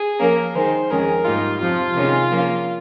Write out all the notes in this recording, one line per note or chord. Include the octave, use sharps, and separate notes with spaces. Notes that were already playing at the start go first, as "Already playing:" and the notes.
Already playing: G#4
F3 A#3 C#4 A#4
D#3 G#3 D#4 C5
F2 D#3 G#3 C#4 G#4 A#4
G#2 G3 A#3 D#4 F4
F2 C3 F3 F4
C3 D#3 G#3 C#4
F3 A#3 C#4